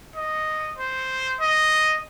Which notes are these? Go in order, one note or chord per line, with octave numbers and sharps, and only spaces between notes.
D#5
C5
D#5